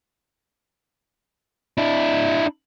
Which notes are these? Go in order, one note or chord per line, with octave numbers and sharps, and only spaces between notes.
D4 E4